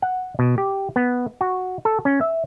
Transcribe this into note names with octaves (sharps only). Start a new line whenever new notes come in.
F#5
B2
G4
B3
F#4
A4
C#4
E5